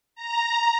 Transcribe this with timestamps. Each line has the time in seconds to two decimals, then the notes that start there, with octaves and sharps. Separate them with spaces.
0.16 A#5